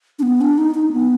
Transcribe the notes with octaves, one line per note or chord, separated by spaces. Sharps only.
D4
B3
D4
D#4
D#4
B3